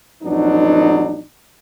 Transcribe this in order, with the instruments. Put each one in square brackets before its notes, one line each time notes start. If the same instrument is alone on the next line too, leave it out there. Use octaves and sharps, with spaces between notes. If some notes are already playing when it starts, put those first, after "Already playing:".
[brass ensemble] A1 F2 F#3 B3 D4 D#4